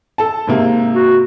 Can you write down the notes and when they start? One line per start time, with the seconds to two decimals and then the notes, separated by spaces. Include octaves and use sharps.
0.18 A4 A5
0.47 G#2 C3 A#3
0.94 F#4